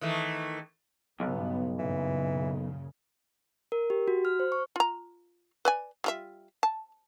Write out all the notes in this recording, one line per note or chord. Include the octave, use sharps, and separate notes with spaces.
D#3 E3 A3
B1 G2 C#3 B3
F#2 A#2 C#3 E3
A#4
G4
F#4
F6
C5
C#6
F4 A#5
B4 D5 G#5
G3 F4 E5
A5